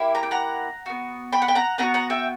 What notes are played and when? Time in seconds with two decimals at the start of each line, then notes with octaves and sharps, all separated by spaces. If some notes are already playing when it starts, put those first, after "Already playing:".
Already playing: A#3 E4 G4
0.15 A#5
0.23 G5
0.31 F#5 A#5
0.86 B3 F#4
1.32 G5 B5
1.42 F#5
1.48 G5
1.55 F#5 A#5
1.78 B3 D4 F#5 A#5
1.83 F#4
1.94 F#5 A#5
2.10 E5 G5